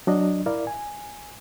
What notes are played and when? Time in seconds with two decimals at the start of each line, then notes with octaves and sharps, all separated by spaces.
0.07 F#3 D4 D#5
0.46 E4 A#4 D5 F5
0.67 G#5